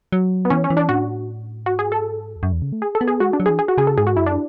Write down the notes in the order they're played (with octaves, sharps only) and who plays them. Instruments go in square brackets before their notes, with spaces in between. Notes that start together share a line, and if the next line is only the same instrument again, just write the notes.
[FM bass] F#3
[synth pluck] B3
[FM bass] E3 [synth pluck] C#4
[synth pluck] C#4
[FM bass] E3
[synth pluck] D4
[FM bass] A2 [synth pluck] F#4
[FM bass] G#2 [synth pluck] F#4
[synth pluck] G#4
A4
[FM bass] E2
F#2
E2
C#3
A3
[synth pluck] G#4
A4
[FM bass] B3
[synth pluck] G#4
[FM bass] G#3 [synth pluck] F#4
[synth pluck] D4
[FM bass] F#3
[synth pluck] G#4
[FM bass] E3
[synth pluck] G#4
F#4
[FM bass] C#3 [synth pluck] G#4
[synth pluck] A4
[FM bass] G#2 [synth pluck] G#4
[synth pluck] F#4
[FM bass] F#2 [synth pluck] E4
[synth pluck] D4